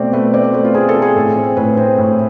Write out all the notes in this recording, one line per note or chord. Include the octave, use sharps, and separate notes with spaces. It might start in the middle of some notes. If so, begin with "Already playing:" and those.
Already playing: B2 A3 C4 D5
A3 B4
C4 D5
C5
A3 B4
F4
C4 G#4
A4
C4
G#4
A2
C4
A2 B4
C4 C5
A2